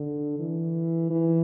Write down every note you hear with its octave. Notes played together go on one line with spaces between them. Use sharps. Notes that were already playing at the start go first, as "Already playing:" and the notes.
Already playing: D3
E3
E3